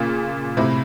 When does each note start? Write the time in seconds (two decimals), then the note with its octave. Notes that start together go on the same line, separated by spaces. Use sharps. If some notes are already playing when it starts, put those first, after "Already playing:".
Already playing: A#2 C#3
0.57 A2 C3